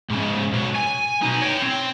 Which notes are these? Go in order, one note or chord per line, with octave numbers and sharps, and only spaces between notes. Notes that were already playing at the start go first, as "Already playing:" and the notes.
G#2 C#3
B1 F#3
G#5
B2 D#4
C#5 G5
C4